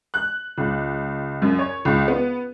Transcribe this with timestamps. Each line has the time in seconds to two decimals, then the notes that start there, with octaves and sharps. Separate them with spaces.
0.14 F#6
0.58 C#2
1.42 F#2
1.59 C#5
1.85 C#2
2.08 B3